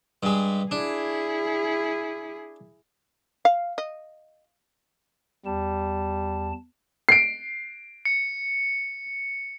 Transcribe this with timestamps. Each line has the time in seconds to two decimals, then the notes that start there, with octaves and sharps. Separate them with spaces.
0.23 G2 G#3
0.71 D4 E4 G#4
3.45 F5
3.78 D#5
5.46 E2 G3 A5
7.09 C7 D7
8.05 C#7